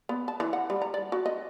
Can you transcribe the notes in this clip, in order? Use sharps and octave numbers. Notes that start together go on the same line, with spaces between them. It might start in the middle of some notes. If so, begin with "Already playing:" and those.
B3
A5
E3
F#5
G3
A#5
D5
F#4
D#5